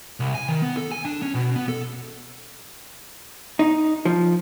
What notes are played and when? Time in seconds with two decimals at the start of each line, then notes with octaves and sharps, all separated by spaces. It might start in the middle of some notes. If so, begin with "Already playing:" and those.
0.20 C2
0.35 G#5
0.49 D#3
0.62 B3
0.77 A4
0.91 G#5
1.05 D4
1.22 C#4
1.35 B2
1.56 B3
1.69 A4
3.59 D#4
4.05 F3